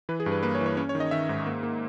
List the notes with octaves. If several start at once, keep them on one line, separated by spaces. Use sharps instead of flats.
E3 B4
G#4
G2
B4
A#3 B4
C#5
E3
C#5
C#4 C#5
C#5
D#3
D#5
D#3 E5
G#2
A#3
A#3